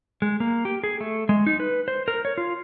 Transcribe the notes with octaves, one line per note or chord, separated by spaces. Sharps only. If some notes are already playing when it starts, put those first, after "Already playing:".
G#3
A#3
G4
G#4
A3
G#3
D#4
B4
C5
A#4
C#5
F4